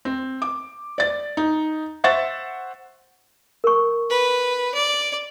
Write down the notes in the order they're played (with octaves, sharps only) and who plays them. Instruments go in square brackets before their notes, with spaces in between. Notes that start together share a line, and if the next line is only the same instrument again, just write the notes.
[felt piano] C4
D6
D5 A6
D#4
C5 E5 F#5 C#6 A6
[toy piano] A#4 C#6
[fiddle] B4
D5